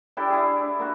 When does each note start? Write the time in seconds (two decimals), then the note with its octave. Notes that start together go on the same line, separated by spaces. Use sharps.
0.17 D4 E4 G4 A4
0.30 E4 G#4
0.59 D4
0.79 A#3 F#4